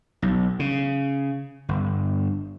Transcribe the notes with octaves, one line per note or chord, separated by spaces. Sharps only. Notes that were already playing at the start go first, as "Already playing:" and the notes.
B1
C#3
G1